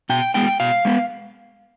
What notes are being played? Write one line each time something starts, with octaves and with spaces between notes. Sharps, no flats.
B2 G5
G#3 B3 G5
B2 F5
G#3 B3